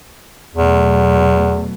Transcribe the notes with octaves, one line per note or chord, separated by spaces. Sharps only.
E2 B2 F#3 A3